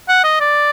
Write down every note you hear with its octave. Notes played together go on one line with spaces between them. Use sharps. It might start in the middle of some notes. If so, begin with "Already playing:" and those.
F#5
D#5
D5